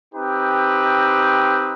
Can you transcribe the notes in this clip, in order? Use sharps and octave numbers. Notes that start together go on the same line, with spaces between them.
C4 D#4 G4 B4